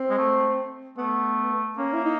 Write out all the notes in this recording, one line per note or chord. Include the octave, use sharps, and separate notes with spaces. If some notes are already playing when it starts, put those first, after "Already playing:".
Already playing: C4
G#3
A3
A3 B3
A#3 C#4
E4
D#4